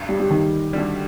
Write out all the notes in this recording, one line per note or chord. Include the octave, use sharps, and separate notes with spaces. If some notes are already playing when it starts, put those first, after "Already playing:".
Already playing: A1 G2
G3
G3
D#3
D2 D3 G3